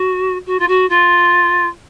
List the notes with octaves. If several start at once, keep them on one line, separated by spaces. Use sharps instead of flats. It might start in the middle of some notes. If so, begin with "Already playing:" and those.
Already playing: F#4
F#4
F4
F#4
F4